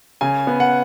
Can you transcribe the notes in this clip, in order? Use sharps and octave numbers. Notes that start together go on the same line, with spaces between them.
C#3 G#5
B3
F#5